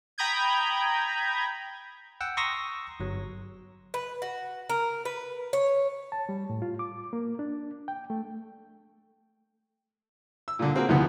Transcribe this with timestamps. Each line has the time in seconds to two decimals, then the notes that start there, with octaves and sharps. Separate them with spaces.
0.18 G5 A#5 B5 D#6 G6 G#6
2.21 F#5 G5 E6
2.37 A#5 C6 C#6 D#6 E6 A#6
3.00 G1 F#3
3.94 B4
4.22 F#4
4.69 A#4
5.05 B4
5.53 C#5
6.12 A5
6.29 G3
6.50 A2
6.62 F4
6.79 D6
7.13 A#3
7.39 D4
7.88 G5
8.10 A3
10.48 E6
10.59 A#2 D3
10.75 A#3 C4 F#4 G#4 A#4
10.89 D2 A2 C3 D#3 F3 B3